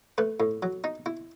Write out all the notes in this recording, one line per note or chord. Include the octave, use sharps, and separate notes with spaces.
A3 B4
A2
F#3
D#4
E4